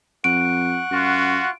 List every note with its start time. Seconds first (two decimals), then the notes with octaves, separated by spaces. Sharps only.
0.24 F2 F#5 C#6 F#6 D7
0.91 F#2 F4 F#4